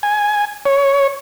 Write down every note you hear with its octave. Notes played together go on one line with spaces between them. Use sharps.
G#5
C#5